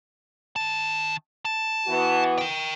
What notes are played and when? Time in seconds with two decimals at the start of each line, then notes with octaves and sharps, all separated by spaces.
0.56 D#3 A5
1.45 A5
1.88 E3 B3 F#4
2.38 A#4 G5